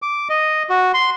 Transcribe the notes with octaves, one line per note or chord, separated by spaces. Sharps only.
D6
D#5
F#4
C6